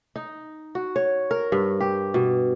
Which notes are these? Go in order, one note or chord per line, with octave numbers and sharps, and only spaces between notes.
D#4
F#4
C#5
A#4
G2
G4
B2